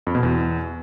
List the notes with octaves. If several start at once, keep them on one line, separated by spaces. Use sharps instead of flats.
F2
B2
E2